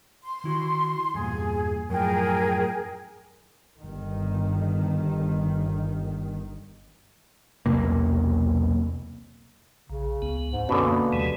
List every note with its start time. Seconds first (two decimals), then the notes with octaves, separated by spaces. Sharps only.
0.24 C6
0.44 D#3 E4 F#4
1.14 E2 G2 A#2 G#4
1.90 F#2 A2 F3 G#4 A#4 G5
3.78 G1 D#3
7.66 B1 E2 C3 A#3
9.89 A#1 C#3
10.22 C#2 B3
10.52 G#2
10.69 F#2 B2 D3 C#4
10.83 A#3
11.12 D#2 C3 E3 G#3